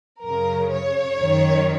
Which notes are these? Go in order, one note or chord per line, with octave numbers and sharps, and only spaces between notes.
F#2 C#3 A#4
C#5
F#2 D#3